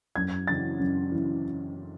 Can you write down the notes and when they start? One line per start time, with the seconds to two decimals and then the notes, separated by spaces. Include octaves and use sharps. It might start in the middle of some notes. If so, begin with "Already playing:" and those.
0.16 F#2 G#6
0.47 C#3 E3 A6
0.79 F#2
1.12 C#3 E3